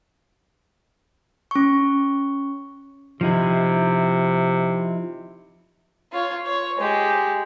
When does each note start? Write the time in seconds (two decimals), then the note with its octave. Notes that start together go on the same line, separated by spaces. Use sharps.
1.51 C#4 C#6
3.21 C3 F3 D#4 E4
6.12 F4 C#5
6.46 C#5
6.78 G#3 G4